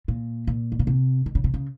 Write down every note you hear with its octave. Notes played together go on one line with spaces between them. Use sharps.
A#2
A#2
D#3
C#3
C3
D#3
C#3
C3
C#3